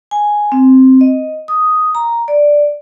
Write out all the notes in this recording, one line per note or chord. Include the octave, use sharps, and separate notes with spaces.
G#5
C4
D#5
D#6
A#5
D5